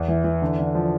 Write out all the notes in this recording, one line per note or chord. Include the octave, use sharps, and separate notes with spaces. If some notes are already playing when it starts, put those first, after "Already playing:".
Already playing: E2
E3
E3
D3
D3
F3